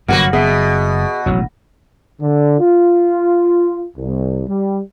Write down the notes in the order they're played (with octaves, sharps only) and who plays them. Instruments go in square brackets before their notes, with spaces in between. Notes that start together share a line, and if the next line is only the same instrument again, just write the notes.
[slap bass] G1 F#2 C3 [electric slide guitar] F#3 F#5 [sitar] A#3 F#4 B4
[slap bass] F#1 B3 [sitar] B2 [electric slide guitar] G#4 E5
[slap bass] E1 A1 E2 [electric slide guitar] F#3
[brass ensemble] D3
F4
C2
G3